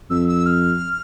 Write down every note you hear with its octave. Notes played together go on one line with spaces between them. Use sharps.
F2 E6
E6
F6